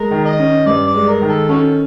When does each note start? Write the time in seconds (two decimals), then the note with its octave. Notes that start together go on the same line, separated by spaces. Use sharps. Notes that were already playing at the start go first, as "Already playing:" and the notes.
Already playing: G#3 A#4
0.11 D#3
0.25 D#5
0.39 C#4
0.66 G2 D5
0.87 D5
0.94 G#3
1.08 A#4
1.22 D#3
1.29 A4
1.49 C#4 F#4 A4